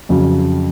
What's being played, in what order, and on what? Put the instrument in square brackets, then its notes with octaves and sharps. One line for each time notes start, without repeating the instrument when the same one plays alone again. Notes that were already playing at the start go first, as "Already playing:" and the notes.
[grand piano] F2 C#3 F#3